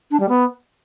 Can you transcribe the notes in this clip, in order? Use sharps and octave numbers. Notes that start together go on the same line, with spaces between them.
D4
G3
B3